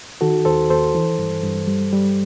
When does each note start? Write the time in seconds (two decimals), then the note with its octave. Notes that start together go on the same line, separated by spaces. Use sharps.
0.21 D#3 F#4 A4
0.45 D#2 A4 C5
0.70 D#2 A4 C5
0.95 E3
1.19 G2
1.43 G2
1.67 G3
1.93 G3